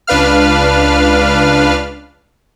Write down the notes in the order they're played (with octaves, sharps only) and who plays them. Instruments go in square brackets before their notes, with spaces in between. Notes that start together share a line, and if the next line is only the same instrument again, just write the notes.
[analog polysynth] C#2 D4 B4 F5 F6